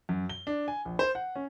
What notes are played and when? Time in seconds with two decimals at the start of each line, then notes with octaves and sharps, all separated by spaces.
0.09 F#2
0.30 G7
0.47 D4
0.68 G#5
0.85 A#1
0.99 C5
1.15 F#5
1.36 C#4